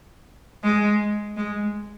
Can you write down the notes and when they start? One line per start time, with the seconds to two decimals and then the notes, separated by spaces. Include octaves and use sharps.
0.63 G#3
1.37 G#3